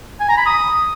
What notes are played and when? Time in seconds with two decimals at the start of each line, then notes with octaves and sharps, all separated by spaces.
0.20 G#5
0.29 A#5
0.37 B5
0.46 D#6